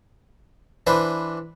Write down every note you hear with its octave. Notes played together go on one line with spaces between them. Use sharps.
E3 D4 B4 C5